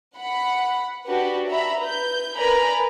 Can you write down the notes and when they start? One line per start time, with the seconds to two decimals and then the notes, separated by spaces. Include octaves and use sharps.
0.16 F#5 B5
1.07 D4 F#4 G4 B4
1.48 E5 A#5 B5
1.82 B4 G6
2.36 A#4 B4 D5 G#5 A#5 B5